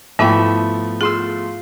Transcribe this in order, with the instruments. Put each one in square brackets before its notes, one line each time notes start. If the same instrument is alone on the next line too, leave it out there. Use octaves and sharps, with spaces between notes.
[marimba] G#2 E4 G5 [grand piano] F3 A3 B3 [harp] E5 B5
[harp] F4 C6 E6 [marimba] G#4